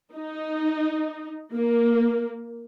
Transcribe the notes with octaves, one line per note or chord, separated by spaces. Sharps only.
D#4
A#3